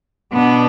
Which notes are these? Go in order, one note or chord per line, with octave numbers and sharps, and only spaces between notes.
B2 B3 D4